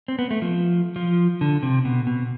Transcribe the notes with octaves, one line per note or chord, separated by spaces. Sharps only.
C4
B3
A3
F3
F3
D3
C3
B2
B2